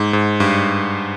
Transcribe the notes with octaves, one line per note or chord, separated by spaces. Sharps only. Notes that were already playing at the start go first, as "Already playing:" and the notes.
Already playing: G#2
G#2
G2